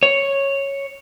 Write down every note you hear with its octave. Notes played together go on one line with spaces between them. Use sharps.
C#5